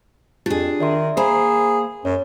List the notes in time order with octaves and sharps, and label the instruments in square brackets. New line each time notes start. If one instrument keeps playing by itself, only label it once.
[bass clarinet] F2 [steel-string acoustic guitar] D4 G#4 [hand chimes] F4 G4 A6
[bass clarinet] D#3 [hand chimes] D5 E5 C6
[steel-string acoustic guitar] A#3 C5 [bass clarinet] G#4 [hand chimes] A#5 B5 C7
[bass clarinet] F#2 [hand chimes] C#5